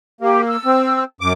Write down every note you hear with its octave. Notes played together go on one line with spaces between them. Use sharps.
A#3 G4
E6
C4
F#2 D6